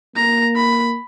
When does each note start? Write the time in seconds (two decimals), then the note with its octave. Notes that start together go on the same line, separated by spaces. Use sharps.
0.16 A#3 A#5
0.56 B5